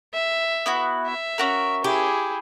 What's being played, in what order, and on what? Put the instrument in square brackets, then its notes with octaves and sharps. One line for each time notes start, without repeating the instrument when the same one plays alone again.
[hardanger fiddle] E5
[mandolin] B3 E4 F#4
[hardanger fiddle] E5
[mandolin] C#4 F#4 A#4
[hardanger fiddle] E4 G#4 [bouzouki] G4